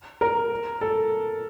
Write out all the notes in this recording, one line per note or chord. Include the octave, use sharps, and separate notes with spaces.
A#4
A4